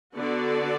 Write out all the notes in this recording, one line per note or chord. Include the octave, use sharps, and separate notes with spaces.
D3 B3 F#4 D5